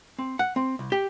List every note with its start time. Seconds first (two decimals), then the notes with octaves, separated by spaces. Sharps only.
0.19 C4
0.39 F#5
0.56 C4
0.79 C2
0.92 G4